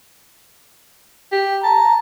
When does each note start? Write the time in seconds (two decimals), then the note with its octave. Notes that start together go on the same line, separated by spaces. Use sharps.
1.32 G4
1.64 A5 A#5